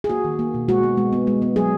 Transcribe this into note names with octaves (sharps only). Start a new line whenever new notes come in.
G#4
A#3 F#4
D#3
A#3
B2
G#3 F#4
B3
G#3
B3
G#3
B3
F#3 G#4